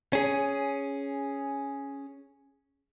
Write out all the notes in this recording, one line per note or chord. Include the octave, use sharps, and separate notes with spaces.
C#4 G#4